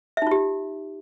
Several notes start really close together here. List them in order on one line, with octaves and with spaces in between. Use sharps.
E5 D#4 F4 G4